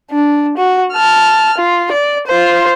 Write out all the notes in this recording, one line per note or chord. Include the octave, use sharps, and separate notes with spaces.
D4
F#4
A5 F6
F4
D5
F4 C5